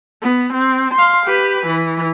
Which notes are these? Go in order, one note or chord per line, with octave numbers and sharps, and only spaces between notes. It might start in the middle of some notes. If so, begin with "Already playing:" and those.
B3
C4
F5 C6
G4 B4
E3